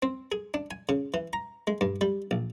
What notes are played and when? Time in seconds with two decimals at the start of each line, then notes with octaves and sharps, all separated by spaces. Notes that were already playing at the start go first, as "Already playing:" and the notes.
0.02 C4
0.32 G#4
0.54 D4
0.71 G#5
0.89 C#3
1.14 E3
1.33 A#5
1.67 G#3
1.81 G2
2.01 G3
2.31 A#1